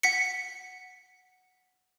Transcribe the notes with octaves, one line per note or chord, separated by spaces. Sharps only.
F#5 B6 C#7